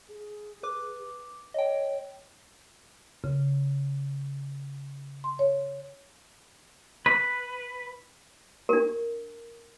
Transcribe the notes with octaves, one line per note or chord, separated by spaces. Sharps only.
G#4
B4 D6
C#5 D#5 G5
C#3
C6
C#5
B4
D4 A#4